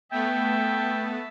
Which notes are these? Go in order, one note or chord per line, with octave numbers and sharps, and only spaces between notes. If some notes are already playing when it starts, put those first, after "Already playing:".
A3 B3 E5 G5 A5